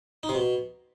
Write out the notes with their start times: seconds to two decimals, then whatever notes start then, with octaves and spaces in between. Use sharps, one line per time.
0.23 D#4
0.29 C3
0.35 B2